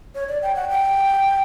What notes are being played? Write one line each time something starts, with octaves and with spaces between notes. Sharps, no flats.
C#5
D5
G5
F#5
G5